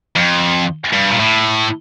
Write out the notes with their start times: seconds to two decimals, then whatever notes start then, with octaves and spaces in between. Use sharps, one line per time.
0.16 F2
0.93 G2
1.11 A#2
1.19 A2